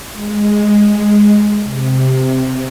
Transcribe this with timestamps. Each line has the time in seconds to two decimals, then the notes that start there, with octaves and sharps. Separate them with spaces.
0.12 G#3
1.62 C3